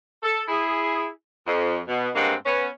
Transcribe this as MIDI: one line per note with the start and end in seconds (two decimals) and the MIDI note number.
0.23 0.42 69
0.48 1.08 64
0.48 1.08 68
1.47 1.80 41
1.87 2.09 47
2.16 2.34 43
2.16 2.34 56
2.16 2.34 58
2.16 2.34 60
2.16 2.34 78
2.46 2.67 59
2.46 2.67 61